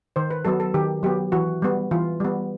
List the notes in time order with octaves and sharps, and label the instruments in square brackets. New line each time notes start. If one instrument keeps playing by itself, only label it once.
[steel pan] D#3 C5
B4
F#3 B3 A4
A4
D#3 G4
F#3 B3 G4
E3 F#4
G3 B3
E3 F4
G3 B3